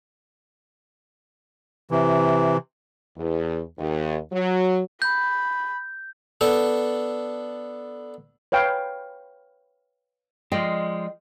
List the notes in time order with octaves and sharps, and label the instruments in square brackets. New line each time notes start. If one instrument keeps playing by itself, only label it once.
[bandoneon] C3 E3
[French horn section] E2
D#2
F#3
[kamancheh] B5 [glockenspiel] G6
[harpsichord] B3 D4 A4
[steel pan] B4 C#5 F5 G5
[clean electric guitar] F3 G#3 [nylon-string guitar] D5 D#5 G5